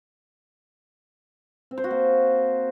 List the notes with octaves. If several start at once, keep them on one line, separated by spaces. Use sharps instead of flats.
C4
C5
F#4
A#3